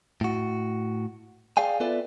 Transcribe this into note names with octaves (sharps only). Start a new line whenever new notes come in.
A2 F#4
G#4 D5 F5 G5 G#5
B3 F4 A4 B4 D5 E5